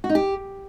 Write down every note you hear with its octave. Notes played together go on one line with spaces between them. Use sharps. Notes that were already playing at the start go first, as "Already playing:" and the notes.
F#4
D#4
G4